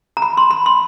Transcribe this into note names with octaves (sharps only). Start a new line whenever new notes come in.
A#5
B5
C6
B5
C6